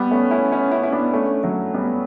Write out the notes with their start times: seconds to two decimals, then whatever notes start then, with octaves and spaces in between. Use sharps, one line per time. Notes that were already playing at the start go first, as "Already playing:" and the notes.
Already playing: G3 B3
0.11 A3 C#4
0.31 C#4 E4
0.52 C#4 E4
0.72 C#4 E4
0.83 E4
0.92 B3 D4
1.13 A3 C#4
1.43 F#3 A3
1.74 G3 B3